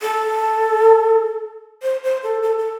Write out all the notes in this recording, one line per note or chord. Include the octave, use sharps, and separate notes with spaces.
A4
C5
C5
A4
A4
A4